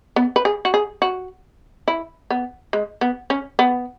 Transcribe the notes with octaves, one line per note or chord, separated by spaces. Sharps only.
B3
B4
G#4
F#4
G#4
F#4
E4
B3
G#3
B3
C#4
B3